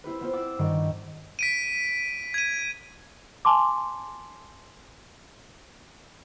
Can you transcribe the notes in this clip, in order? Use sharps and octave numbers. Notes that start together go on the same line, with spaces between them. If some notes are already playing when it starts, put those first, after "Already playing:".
C4 E4 G4 B4
B3 C4 F4 C5
F#5 D6 E6 A6
G2 D#3 G3 G4 F#5 C#6
B6 D7 D#7
G#6 D#7
G#5 A5 C6 D6